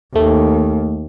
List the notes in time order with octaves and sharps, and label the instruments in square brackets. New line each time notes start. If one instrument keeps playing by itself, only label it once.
[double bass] D#2 [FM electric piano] A3